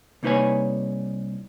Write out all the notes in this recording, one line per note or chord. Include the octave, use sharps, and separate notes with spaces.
C2 A#3 D#4 B4 C#5 G#5